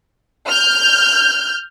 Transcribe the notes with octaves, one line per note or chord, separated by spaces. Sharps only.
F6 G6